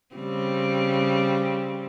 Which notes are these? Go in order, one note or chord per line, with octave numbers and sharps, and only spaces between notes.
C#3 G3 C4